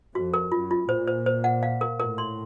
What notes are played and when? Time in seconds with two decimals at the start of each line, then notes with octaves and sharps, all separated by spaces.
0.15 F2 F#4
0.34 A#4
0.52 F#2 F4
0.71 F4
0.89 A#2 C5
1.08 C5
1.26 C5
1.44 F#5
1.63 F5
1.81 A#4
1.99 A2 A#4
2.18 C6